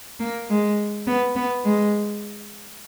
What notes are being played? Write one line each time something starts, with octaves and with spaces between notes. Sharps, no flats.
A#3
G#3
B3
B3
G#3